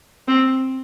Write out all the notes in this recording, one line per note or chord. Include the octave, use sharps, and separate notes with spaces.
C4